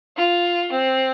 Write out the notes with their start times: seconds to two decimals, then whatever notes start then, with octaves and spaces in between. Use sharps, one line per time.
0.17 F4
0.71 C4